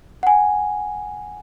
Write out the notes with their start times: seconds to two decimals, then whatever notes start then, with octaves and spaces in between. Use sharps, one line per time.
0.23 F#5 G#5